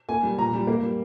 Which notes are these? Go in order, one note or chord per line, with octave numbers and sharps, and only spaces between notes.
A#3 G#5
G3
A#2 A#5
G3
A#3
G3